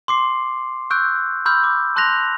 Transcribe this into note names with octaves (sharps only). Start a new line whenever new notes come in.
C6 D6 C7
C#6 E6 F#6 G6 D7
B5 C6 D6 E6 F6 G6
D6
A5 C6 F#6 G6 A#6 F7